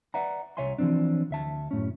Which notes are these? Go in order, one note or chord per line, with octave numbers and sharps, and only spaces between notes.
B4 D5 E5 F#5 A#5
C2 C#5 E5 G#5 C6
E3 F3 G#3 C4 D4
D2 E5 A5
F#2 A2 C#4